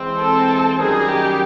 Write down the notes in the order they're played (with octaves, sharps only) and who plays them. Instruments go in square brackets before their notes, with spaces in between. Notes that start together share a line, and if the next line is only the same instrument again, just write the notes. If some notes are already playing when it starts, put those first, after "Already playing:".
Already playing: [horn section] E3 G#3 C4
[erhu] A4
[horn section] F#2 D#3 G3 A#3 D#4 [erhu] G#4
[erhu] G4